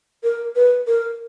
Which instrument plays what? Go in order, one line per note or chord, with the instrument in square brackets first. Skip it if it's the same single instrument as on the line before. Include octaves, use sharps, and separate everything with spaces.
[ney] A#4
B4
A#4